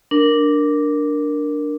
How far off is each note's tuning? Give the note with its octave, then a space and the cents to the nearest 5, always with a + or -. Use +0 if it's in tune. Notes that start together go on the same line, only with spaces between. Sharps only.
D4 +0 A#4 +0